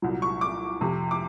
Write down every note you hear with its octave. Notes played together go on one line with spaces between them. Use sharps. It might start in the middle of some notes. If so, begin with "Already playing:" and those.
C2 A#2 F#3
C#6
D6
F2 C3 F3
D6